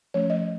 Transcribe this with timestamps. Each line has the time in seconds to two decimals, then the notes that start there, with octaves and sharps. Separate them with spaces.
0.14 F3 A3 C#4 C#5
0.30 D#5